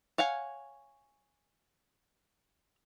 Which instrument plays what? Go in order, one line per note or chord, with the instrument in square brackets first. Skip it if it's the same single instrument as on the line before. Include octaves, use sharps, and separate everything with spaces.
[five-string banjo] C#5 F5 F#5 G#5